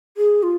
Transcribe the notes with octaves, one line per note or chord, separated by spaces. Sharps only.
G#4
F4